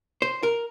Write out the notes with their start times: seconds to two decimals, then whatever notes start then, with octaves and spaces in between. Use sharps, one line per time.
0.22 C5
0.43 A#4